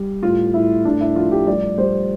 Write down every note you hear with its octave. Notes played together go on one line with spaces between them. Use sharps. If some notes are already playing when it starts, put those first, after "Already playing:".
Already playing: G3
A2 F4
A2 E4
A2 D4
E4
F3 F4
G4
G3 D5
G3 C5